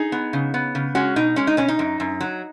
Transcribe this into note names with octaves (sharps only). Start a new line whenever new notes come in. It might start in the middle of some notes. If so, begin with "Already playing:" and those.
Already playing: D#4 G#4
B3
C#3
B3
C#3
G#3 C#4 F#4
B2 D#4
G#3 C#4
D#4
B2 C#4
D#4
F#2
F#2
F#3